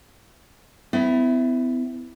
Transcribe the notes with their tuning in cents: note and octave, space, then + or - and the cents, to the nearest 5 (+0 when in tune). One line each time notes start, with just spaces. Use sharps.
B3 +45 E4 +0